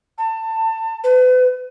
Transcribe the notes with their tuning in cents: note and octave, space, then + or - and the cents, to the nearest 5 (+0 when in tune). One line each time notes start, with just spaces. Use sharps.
A5 +25
B4 +40